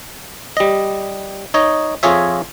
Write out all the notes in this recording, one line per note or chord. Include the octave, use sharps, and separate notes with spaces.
G3 D#5
D#4 C#5 D#5
F2 F4 G#4 C#5 E5